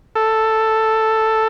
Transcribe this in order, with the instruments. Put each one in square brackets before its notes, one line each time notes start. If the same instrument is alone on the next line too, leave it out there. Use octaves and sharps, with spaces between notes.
[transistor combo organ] A4